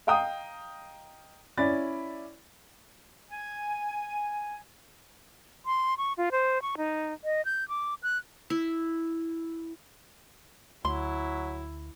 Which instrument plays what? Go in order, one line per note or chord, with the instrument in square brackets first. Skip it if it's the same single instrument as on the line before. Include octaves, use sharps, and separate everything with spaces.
[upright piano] D#5 F5 G5 A#5 D#6
C#4 E4 D5 B5 A6
[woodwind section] G#5
[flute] C6
C#6
F4
C5
C#6
D#4
D#5
G6
D6
F#6
[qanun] E4
[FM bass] D2 [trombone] F#3 [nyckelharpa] E4 [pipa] C6